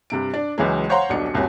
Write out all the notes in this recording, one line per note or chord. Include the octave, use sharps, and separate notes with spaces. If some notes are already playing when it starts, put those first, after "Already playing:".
G2 C3 D7
D4 D5
C#2 E3 F#3 G#3
C5 C#5 F5 F#5 A#5 C6
D#1 B1 D4 C#7
F#1 C2 C#4 F#4 G#5